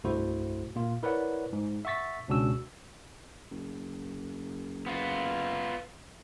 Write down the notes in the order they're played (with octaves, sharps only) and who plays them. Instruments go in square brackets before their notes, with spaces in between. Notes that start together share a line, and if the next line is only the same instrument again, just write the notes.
[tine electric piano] C2 G2 A3 E4 F#4 C5
A#2 A#3 F4
E4 A#4 B4 C#5 D5 F#5
G#2
E5 F#5 C#6 A6 B6
C#2 B2 C#4 D4 F#4 E6
[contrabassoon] F#1
[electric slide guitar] B3 F4